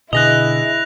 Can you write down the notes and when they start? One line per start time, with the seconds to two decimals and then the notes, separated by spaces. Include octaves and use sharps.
0.13 B2 D3 E4 G#4 D#5 F#6 A#6 F7